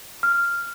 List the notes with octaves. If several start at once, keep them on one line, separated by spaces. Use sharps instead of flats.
F6